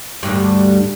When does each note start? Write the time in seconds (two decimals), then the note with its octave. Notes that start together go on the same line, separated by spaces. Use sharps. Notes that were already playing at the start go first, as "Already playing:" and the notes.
0.23 D2 G2